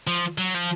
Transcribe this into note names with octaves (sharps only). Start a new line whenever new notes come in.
F3
F#3
F3